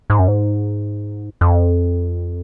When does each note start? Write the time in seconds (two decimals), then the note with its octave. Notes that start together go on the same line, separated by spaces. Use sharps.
0.10 G#2
0.19 F#2
0.28 G#2
1.41 F2